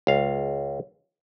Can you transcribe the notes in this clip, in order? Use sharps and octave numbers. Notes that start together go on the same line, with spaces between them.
C#2 F5